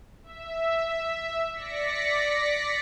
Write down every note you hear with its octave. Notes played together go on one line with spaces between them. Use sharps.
E5
D5 A#6 B6 C#7